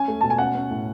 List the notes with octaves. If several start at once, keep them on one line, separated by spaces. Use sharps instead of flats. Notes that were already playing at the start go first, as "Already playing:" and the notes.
Already playing: C#4 G#5
A3
B2 A5
G#5
C#4 F#5
C#4
A2